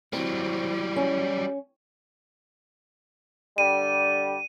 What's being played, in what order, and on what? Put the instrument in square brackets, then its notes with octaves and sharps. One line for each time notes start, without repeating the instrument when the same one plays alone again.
[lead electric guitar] F#3 G3 [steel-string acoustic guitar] C4 [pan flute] E4
[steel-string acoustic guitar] C#4
[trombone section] D3 G3 [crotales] D#7